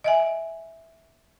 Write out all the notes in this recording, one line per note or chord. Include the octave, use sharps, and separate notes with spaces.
D#5 E5 G#5